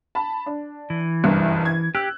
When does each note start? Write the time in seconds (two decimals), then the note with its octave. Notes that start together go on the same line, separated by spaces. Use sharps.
0.15 A5 B5
0.46 D4
0.90 E3
1.24 F#1 C2 G2
1.65 G#6
1.95 G4 E6 F#6